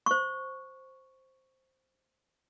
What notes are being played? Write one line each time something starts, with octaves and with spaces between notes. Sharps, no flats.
C5 C#6